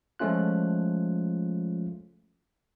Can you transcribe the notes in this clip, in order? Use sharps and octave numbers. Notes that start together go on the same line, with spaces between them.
F3 G#3 A3 C#4 F4 F#6